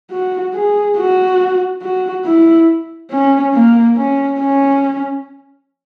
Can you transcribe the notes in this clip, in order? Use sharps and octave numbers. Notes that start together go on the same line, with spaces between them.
F#4
G#4
F#4
F#4
E4
C#4
A#3
C#4
C#4